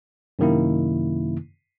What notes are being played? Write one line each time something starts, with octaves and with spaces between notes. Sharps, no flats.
F#2 C3 D#3 A#3 E4